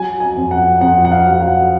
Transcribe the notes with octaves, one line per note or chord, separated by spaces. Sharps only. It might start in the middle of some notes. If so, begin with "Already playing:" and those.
Already playing: F#3 G#5
G#5
F2
F#5
F2 F#5
F#5
F5
F#3
F#5